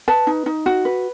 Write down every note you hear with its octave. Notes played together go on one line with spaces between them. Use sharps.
B4 A5
D#4
D#4
F#4
B4